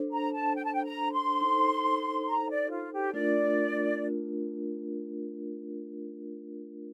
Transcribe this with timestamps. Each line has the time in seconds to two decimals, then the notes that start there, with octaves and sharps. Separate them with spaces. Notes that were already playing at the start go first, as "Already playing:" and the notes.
Already playing: D4 A4 C5
0.12 A#5
0.34 A5
0.55 G5
0.64 A5
0.74 G5
0.84 A#5
1.13 C6
1.41 D#4 A4 C5
2.28 A#5
2.49 D5
2.70 F4
2.92 G4
3.13 A3 D4 F4 A#4 D5